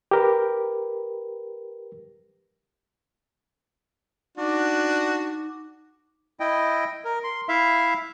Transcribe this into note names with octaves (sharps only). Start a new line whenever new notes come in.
G4 A#4 B4
D4 D#4 F#4 D6
E4 D#5 G5
A#4
C6
E4 E5 F5